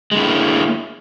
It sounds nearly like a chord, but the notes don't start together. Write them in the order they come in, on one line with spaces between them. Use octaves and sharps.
G#3 D3 E4 A#3